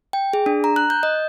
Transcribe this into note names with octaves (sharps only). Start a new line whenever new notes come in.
G5
G#4
D4
A#5
F#6
G6
D#5